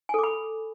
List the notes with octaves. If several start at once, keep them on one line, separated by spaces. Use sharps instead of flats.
A4 G#5 B5 D6